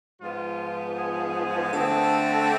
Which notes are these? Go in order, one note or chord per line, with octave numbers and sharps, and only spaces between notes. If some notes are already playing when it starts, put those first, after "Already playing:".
G#2 F3 B3 F4
G#4
D3 A3 C4